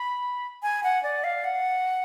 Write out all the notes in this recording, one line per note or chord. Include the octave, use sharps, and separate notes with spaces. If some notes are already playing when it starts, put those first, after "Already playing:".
Already playing: B5
G#5
F#5
D5
F5
F#5